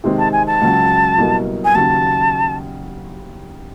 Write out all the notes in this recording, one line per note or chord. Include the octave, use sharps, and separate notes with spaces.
C3 D#3 G#3 C4
A5
G#5
A5
C#2 C#3 F#3
C2 B2 F#3 A#3
G#5
D#2 C#3 F#3 A5